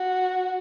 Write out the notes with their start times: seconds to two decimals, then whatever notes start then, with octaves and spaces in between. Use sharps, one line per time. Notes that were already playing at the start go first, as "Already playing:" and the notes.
Already playing: F#4